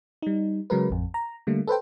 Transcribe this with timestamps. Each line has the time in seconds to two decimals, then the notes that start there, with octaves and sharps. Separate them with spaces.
0.22 G3 D#4
0.70 C#3 F#3 G#3 A#4 B4
0.90 A1 F2
1.14 A#5
1.47 D3 G3 A3 A#3
1.68 A4 B4 C5 G5